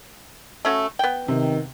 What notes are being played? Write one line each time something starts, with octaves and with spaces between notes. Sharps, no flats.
A3 C#4 F#4
B3 G5
C3 D#3